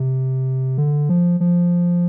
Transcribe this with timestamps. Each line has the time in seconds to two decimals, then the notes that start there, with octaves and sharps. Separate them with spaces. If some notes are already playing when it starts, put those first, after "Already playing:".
Already playing: C3
0.78 D3
1.09 F3
1.40 F3